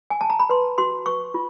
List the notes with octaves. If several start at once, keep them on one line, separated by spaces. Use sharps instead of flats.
G#5
A5
A#5
B5
B4 C6
F#4 C6
B4 C#6
F4